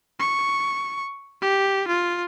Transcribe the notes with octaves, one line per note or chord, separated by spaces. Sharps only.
C#6
G4
F4